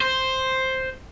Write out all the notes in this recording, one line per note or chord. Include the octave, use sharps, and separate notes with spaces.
C5